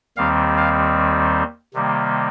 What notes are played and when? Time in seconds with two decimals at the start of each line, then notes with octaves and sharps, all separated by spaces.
0.17 D#2 D#3 G3 C4 F5
0.57 F5
1.74 C3 D#3 G3 A#3